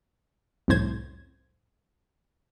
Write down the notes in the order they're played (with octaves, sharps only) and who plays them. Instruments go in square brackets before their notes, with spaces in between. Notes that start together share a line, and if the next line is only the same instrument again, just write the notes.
[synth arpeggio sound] C2 F2 A2 C5 G#6